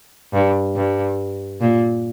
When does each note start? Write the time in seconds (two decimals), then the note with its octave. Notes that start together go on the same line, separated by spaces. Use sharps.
0.33 G2
0.76 G2
1.61 A#2